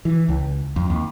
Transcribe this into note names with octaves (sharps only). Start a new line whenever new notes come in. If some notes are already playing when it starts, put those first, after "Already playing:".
E3
C#2
F2
D#2